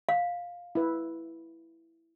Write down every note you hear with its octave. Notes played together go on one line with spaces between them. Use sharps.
F5
E4 B4